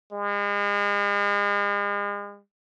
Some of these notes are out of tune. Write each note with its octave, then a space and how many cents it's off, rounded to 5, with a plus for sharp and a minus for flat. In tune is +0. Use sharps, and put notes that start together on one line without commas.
G#3 -40